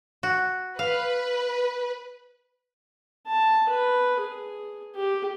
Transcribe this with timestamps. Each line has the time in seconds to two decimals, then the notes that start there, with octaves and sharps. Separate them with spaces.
0.23 F#4
0.79 B4 F5
3.27 A5
3.69 B4
4.20 G#4
4.96 G4